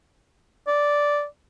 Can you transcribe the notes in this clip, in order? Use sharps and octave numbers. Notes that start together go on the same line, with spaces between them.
D5